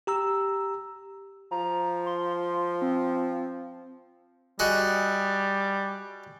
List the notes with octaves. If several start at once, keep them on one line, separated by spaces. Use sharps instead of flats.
G4 A#5 E6
F3 A#5
C6
C4
G3 F#4 G#4 D#5